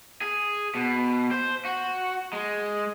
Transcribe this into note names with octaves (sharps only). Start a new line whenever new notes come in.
G#4
B2
C5
F#4
G#3